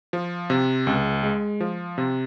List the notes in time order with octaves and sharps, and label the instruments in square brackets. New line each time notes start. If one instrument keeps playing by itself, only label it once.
[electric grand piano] F3
C3
C#2
G#3
F3
C3